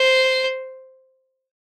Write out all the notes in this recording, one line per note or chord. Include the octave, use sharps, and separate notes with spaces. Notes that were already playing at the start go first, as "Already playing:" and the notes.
Already playing: C5